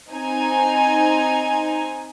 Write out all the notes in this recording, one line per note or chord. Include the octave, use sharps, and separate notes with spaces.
C4 D#4 G#5